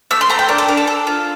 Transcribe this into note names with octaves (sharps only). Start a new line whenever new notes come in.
A3 E6
C6
A3 A#5
G5
D4 A#4
A4
D4 A#4
A4
A4
F4